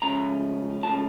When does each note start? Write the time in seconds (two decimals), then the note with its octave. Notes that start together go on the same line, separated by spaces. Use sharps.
0.02 C#2 C#3 F3 A3 C#4 A#5
0.83 C#2 C#3 F3 A3 C#4 A5